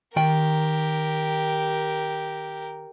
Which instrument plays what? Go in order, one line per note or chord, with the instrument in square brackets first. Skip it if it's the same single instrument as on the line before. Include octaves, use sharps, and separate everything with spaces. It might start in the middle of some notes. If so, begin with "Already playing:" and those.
[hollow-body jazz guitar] D#3 G5 [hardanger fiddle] G4 A#4